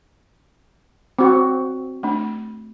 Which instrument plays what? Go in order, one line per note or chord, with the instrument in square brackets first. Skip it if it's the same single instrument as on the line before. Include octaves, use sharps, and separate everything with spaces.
[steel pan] C4 F#4 [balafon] D6
[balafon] A3 D4